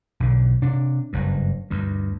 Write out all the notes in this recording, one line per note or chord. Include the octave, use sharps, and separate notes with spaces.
B1 D3
C3 D4
F#1 G2
D2 G2